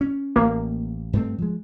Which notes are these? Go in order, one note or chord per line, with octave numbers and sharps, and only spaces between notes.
C#4
A1 A#3
G2 A3 C4
F3 G#3